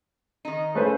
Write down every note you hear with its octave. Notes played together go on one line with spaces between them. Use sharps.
D#3 D#4
C#3 A3 B4 C5